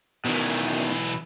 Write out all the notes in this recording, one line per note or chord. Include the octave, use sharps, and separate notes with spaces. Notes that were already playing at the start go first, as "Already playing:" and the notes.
B1 B2 D#3 E3